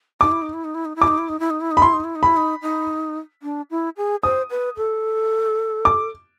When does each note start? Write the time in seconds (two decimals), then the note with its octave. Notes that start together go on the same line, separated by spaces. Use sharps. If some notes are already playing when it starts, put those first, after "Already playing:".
0.21 D#4 D6
0.32 E4
0.42 D#4
0.54 E4
0.64 D#4
0.74 E4
0.85 D#4
0.96 E4
1.02 D6
1.08 D#4
1.18 E4
1.29 D#4
1.40 E4
1.50 D#4
1.61 E4
1.71 D#4
1.77 B5
1.82 E4 C6
1.93 D#4
2.04 E4
2.15 D#4
2.23 E4 B5
2.37 D#4
2.62 D#4
3.43 D4
3.70 E4
3.97 G#4
4.23 C5 D#6
4.51 B4
4.77 A4
5.85 D6